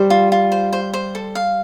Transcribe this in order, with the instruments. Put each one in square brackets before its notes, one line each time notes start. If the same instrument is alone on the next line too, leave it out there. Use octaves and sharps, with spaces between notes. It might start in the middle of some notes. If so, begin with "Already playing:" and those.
Already playing: [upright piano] G3 [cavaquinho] C5
[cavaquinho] F4
F4
C5
C5
C5
A4
F5